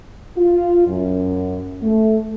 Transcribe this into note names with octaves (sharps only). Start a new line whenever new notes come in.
F4
F#2
A3